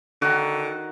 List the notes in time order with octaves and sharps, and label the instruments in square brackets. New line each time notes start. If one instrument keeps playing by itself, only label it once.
[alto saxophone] D3 [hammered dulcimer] D#3 F#4